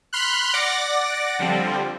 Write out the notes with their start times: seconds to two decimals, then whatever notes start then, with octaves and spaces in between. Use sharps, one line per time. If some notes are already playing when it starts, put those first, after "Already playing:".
0.13 B5 C6 F6 F#6
0.54 D5 F#5 D6 A#6
1.39 D3 F3 G3 C4